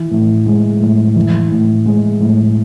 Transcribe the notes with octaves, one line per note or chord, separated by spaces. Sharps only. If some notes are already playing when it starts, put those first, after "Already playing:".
Already playing: E3
A2
G#3
A2
E3
A2
G#3
A2